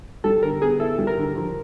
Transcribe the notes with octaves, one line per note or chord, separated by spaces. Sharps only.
G3 A4
D3 A#4
B3 G#4
E4 A4
G3
A#4
D3
F3